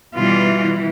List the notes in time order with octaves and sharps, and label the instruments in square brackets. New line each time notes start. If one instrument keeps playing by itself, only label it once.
[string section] B2 E3 [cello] G3 F4